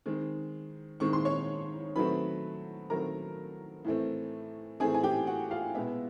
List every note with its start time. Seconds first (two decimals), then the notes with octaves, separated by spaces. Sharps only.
0.06 D#3 G#3 C4
1.00 D#3 G#3 C4 C#6
1.13 C6
1.25 C#5 C#6
1.96 D#3 F#3 A3 C4 B4 B5
2.90 D#3 F#3 A3 C4 A#4 A#5
3.85 A2 E3 A3 C4
4.80 A2 E3 A3 C4 G#4 G#5
4.94 G#5
5.03 G4 G5
5.27 F#4 F#5
5.51 F4 F5
5.75 B2 G#3 B3 E4 E5